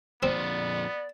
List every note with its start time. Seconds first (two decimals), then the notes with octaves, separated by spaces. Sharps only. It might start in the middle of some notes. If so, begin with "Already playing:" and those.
0.23 F2 A#2 B3 C4 D5